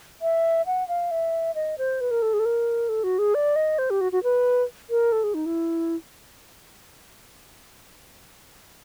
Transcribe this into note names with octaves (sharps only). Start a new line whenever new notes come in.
E5
F#5
F5
E5
D#5
C5
B4
A#4
A4
G#4
A4
A#4
A4
F#4
G#4
D5
D#5
C5
G4
F#4
F#4
B4
A#4
A4
G#4
D#4
E4